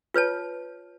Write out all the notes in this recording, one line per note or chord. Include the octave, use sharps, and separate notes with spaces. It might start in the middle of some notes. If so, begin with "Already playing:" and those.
F4 B4 C#5 A5